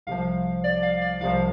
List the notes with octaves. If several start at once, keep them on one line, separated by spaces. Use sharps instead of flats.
C2 C3 F3 F5
D5
F5
D5
C2 C3 F3 F5